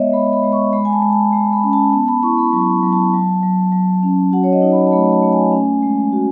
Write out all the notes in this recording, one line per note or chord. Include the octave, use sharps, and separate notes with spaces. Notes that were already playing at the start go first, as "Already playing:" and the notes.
Already playing: G#3 B3 C#5 D#5 E5
G#3 B5
B5
G#3
C#6
G#3 B5
G#5
A5
G#3
A5
G#3
B5
C#4
A5
B3 A5
B5
E4 C#6
B5
F#3 C#6
F#3
A5
F#3
F#3
F#3
C#4
F#4 F#5
C#5
D#5
D#4
B5
A5
A3 B5
A5
A3
G#5
C#4
G#3
F#4